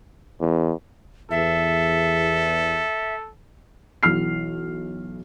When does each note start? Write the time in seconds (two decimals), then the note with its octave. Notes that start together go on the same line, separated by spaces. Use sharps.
0.41 E2
1.31 E2 A4 E5
4.03 B1 E3 F6 C7